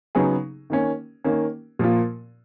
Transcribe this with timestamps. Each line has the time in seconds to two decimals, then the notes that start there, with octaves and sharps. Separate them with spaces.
0.15 C#3 F#3 B3 D#4 G#4
0.70 D#3 A#3 C#4
1.24 D#3 A#3 C#4
1.79 A#2 F3 A#3 F4